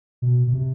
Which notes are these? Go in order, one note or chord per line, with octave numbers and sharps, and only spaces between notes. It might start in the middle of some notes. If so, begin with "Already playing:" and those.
B2
B2
C3